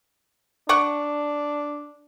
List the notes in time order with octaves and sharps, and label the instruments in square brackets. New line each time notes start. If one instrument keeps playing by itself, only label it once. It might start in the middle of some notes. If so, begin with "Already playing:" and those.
[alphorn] D4 [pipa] D5 F#5 C#6